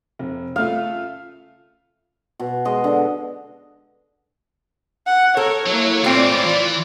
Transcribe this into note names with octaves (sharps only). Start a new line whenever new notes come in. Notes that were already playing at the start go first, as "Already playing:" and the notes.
F1
C#3 A3 F4 F5
B2
G#3 D#5
D3
F#5
A4 A#4 C#5
F#3 A#3 E4
A2 G#3 C4 D4 F4 D5
E3